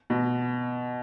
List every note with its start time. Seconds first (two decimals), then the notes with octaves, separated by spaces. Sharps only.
0.10 B2